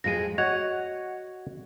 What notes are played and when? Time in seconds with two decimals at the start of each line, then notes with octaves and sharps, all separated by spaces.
0.04 F2 G#3 G#4 A#6 D#7
0.38 F#4 C#5 D#5 F#5 G#6 F7